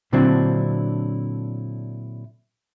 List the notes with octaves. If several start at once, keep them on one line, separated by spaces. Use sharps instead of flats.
A#2 D3 F#3 C4 D4 E4